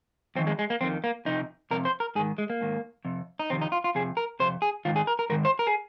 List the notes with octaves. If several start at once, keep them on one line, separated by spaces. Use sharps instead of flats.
F2 D#3 C4
G#3
G#3
A#3
F2 D#3 C4
A#3
F2 C3 D#4
F2 C3 A#4
C5
A#4
G#2 D#3 G#4
G#3
A#3
G#2 D#3
F2 C3
D#4
F2 C3 D#3 C4
D#4
F4
F4
F2 C3 G#4
A#4
F2 C3 C5
G#4
G#2 D#3 F4
G#4
A#4
A#4
G#2 D#3 A#4
C5
A#4
G#4